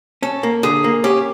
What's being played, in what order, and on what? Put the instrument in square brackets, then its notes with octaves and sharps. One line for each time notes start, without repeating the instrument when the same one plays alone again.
[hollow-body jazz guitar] C#4 [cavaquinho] A4
[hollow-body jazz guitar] A#3
[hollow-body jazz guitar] D3 [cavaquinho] G#4
[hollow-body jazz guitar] A#3
[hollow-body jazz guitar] C#4 [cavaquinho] G4